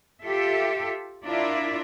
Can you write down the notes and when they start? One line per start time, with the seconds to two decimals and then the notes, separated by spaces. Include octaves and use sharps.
0.23 F4 G4 A4 E5
1.25 D4 E4 F4 A#4 D5 E5